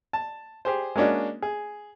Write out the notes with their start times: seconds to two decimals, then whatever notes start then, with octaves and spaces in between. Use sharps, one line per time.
0.13 A5
0.65 G4 G#4 C5
0.96 G#3 A#3 C#4 D4 F#4
1.42 G#4